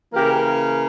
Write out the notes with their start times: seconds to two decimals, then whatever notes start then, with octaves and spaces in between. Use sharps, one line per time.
0.13 C#3 E3 A#3 G4 A#4